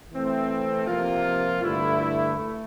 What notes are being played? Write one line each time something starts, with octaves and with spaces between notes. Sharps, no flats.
E3 A3 C4
C3 F3 A#3 F4
G2 D3 A3 E4
A3